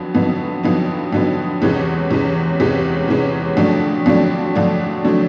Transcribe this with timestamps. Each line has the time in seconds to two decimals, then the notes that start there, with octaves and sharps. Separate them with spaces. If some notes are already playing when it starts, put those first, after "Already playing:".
Already playing: F2 D3 F#3 B3
0.14 F2 D3 F#3 B3 D#4
0.63 F2 D3 F#3 B3 D#4
1.13 F2 D3 F#3 B3 D#4
1.62 E2 C3 E3 G#3 C#4
2.11 E2 C3 E3 G#3 C#4
2.60 E2 C3 E3 G#3 C#4
3.08 E2 C3 E3 G#3 C#4
3.57 F2 D3 F#3 A3 D4
4.06 F2 D3 F#3 A3 D4
4.55 F2 D3 F#3 A3 D4
5.04 D3 F#3 A3 D4